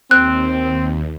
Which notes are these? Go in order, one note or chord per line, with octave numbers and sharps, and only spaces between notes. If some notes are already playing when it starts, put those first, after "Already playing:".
D#2 C4 F#6